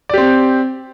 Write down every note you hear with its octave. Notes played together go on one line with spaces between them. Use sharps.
C4 G4 D5